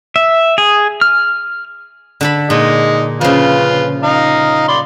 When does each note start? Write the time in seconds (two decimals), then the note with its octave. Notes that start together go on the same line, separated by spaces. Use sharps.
0.16 E5
0.58 G#4
1.01 F6
2.21 D3 A4 B5
2.50 A#2 G#3 D#4
3.21 C#3 F3 F4 B4
4.03 D#4 F5 A#5
4.68 D5 B5 C6